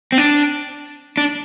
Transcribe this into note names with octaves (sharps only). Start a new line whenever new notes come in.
C4
D4
D4